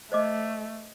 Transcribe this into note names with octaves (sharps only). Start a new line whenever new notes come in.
A3 C5 D#5 D6